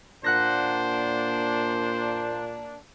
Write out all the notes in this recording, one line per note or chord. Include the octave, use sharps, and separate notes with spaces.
A#2 A#3 D4 C5 F#5 F#6 A#6